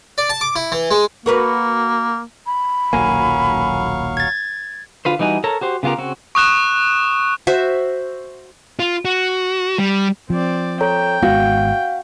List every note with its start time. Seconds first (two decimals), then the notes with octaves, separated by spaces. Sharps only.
0.18 D5
0.29 A5
0.41 D6
0.56 E4
0.72 E3
0.91 G#3
1.26 A#3 F#4 A#4 B4
2.46 B5
2.93 D#1 B1 F#3 A#3 F5 G#5 C#6
4.17 G#6 A6
5.05 D3 F4 B4 C5
5.19 E3 G3 D#4 F#4 G#5
5.44 A4 A#4 C#5 A5 A#5
5.61 F#4 G4 C5
5.83 C#3 B3 F4 G4 A#4
5.98 C#3 C4 F#4
6.35 C#6 D#6 F#6 E7
7.47 F#4 C5 E5
8.79 F4
9.05 F#4
9.78 G3
10.30 F3 C4 D5
10.81 A4 C#5 G5 A#5
11.23 G#1 G#3 B3 F#4 F5